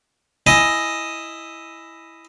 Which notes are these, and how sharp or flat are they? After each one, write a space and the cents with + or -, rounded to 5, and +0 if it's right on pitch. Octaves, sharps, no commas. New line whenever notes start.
E4 +0 D#5 +5 G#5 +0